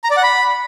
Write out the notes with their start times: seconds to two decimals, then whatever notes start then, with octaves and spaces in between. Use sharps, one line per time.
0.04 A#5
0.10 D5
0.17 F#5
0.23 B5